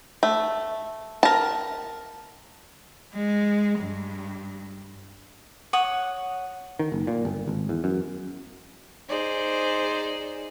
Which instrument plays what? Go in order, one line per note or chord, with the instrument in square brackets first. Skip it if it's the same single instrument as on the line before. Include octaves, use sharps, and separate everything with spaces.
[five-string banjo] A3
A#4 A5
[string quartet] G#3
G2
[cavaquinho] C#5 F#5 D#6
[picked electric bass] D#3
F#1
A#2
G1
G#1
E2
F#2
[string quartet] D#4 G#4 C5 D5